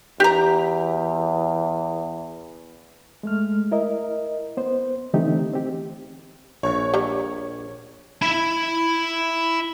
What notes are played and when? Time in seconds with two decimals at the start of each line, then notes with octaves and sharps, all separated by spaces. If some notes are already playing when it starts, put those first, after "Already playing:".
0.20 E2 G4 A#5
3.23 G#3 A3 F6
3.71 E4 A#4 D#5
4.57 B3 C5
5.14 D3 E3 A3 C4 D#4 G4
5.53 C4 G4
6.63 A#1 C#5
6.94 G3 A#5
8.22 E4 B5